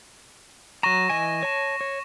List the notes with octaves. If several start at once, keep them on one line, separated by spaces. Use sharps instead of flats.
F#3 A#5 C#6 A#6 E7
E3 D#5 G#5
C#5 A5
C#5